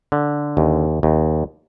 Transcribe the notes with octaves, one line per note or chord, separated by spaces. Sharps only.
D3
D#2
D#2